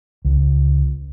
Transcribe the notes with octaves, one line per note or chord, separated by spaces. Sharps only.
C#2